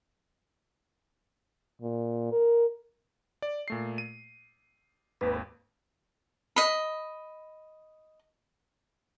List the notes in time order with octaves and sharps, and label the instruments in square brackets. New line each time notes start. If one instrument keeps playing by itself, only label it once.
[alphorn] A#2
A#4
[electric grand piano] D5
A#2 A3 C7
D#7
[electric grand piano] G#1 D#2 [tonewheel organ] B4
[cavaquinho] D#5 B5